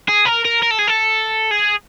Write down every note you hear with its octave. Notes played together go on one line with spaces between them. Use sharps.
G#4
A#4
A#4
A#4
A4
G#4
A4
G#4